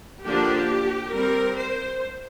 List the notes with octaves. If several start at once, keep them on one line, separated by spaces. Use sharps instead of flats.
D3 F3 A#3 D4 G4
G3 C4 A#4
C5